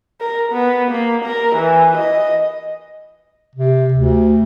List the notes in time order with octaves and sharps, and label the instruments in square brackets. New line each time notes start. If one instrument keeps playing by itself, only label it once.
[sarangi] A#4
B3
A#3
A#4
E3
D#5
[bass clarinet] C3
D2